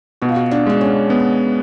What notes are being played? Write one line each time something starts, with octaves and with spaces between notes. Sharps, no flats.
B2 F#4
F4
F#4
D4
G#3 D4
C#4
B3